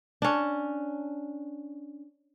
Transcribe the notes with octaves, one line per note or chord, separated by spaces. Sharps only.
C#4 D4